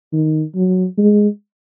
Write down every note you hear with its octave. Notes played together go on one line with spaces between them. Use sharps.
D#3
F#3
G#3